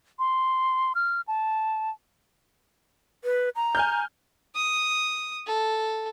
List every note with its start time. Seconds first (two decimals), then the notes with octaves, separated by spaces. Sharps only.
0.19 C6
0.95 F6
1.28 A5
3.24 B4
3.56 A#5
3.75 G#5 F6 G6
4.56 D#6
5.47 A4